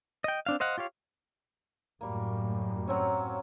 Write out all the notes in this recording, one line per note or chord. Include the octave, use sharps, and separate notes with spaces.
D#5 G5
C4 D4 F5
C5 D#5 F5 F#5
F4 G4 C#5 F5
F#2 A2 G3 A#3
F#3 C4 C#4